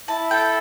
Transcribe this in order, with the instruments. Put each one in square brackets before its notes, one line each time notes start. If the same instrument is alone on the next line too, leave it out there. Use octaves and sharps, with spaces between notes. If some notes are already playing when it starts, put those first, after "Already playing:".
[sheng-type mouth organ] E4 [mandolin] A5
[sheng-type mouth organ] A4 [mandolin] G5